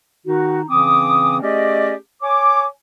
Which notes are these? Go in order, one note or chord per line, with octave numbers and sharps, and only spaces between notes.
D#3 D#4 F#4
C#3 E3 C4 C#4 D6 D#6
A3 C#4 G4 G#4 D5 D#5
C#5 G#5 D6